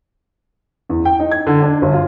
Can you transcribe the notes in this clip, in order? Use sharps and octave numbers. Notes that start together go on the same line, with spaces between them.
E2
G5
D#4
G#6
D3
D4
G1
F4